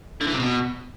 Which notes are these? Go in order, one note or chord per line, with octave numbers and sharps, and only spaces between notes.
D3
E3
C3
B2